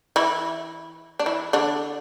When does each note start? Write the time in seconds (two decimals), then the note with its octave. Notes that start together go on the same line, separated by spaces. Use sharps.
0.16 E3 E4
1.19 D4
1.26 E3 E4
1.53 D3 D4